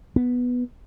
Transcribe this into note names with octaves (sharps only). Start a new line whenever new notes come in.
B3